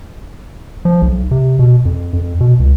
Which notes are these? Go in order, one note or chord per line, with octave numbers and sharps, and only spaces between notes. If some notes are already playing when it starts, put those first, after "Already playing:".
F3
B1
C3
B2
F2
F2
B2
C#2